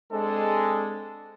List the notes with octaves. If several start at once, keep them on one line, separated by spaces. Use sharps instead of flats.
G#3 C4 D4 A4